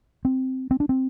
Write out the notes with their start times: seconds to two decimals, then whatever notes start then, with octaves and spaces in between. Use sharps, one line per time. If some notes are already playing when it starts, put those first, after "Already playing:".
0.25 C4
0.71 C4
0.80 D4
0.89 C4